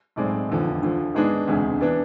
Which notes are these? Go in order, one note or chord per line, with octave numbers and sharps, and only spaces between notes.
B1 A2 G#3 C4 D5
F1 E2 D3 F3
D2 D3 F3
G#1 G#2 G#3 B3 D4
E1 D2 C3 G#3
E3 B3 D4 D5